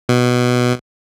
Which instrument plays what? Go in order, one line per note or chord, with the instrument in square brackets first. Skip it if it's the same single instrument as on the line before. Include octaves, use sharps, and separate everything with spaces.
[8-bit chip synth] B2